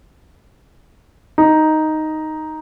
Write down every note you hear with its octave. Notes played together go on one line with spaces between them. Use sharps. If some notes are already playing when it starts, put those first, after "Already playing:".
D#4